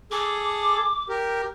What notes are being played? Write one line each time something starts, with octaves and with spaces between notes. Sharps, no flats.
G#4 A4 D6
G4 A#4